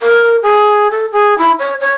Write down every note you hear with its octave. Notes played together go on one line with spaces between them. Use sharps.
A#4
G#4
A4
G#4
E4
C#5
C#5